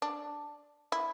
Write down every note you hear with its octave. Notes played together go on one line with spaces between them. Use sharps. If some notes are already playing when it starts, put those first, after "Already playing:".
D4
E4